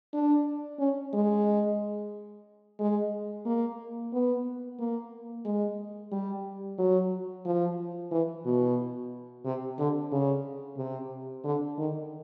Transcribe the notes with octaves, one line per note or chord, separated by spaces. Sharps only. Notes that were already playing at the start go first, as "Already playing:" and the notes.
D4
C#4
G#3
G#3
A#3
B3
A#3
G#3
G3
F#3
F3
E3
B2
C3
D3
C#3
C3
D3
D#3